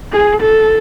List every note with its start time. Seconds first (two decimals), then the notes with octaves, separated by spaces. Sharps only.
0.12 G#4
0.41 A4